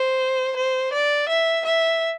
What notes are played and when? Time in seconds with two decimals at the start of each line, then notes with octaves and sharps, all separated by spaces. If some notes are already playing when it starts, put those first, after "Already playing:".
Already playing: C5
0.56 C5
0.93 D5
1.29 E5
1.65 E5